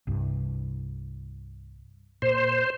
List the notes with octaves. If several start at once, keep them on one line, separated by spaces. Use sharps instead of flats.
C2 G2
A#2 C5